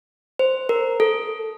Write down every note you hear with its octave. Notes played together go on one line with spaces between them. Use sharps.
C5
A#4
A4